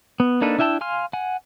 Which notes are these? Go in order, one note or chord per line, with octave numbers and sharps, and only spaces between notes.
B3
A#3 D4 D#4 A4 B4
D4 E4 E5 G5 A5
F5 G#5 C6 F6
F#5 G#5